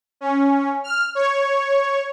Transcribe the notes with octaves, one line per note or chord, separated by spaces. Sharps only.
C#4
F6
C#5